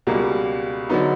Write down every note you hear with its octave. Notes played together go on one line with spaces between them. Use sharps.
C#2 B2 G3 A#3
D3 F#3 B3 D#4